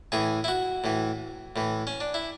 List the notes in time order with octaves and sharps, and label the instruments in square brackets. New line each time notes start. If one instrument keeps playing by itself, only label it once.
[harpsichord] A2 E3 G#4
E4
F#4
A2 E3
A2 E3
C#4
D4
E4